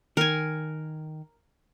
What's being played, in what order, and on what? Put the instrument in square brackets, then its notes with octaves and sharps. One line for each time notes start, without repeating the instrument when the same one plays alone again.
[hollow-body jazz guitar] D#3 [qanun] A#4 G#5